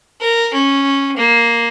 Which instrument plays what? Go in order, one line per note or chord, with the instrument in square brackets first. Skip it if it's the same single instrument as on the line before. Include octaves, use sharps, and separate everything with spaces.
[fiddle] A#4
C#4
A#3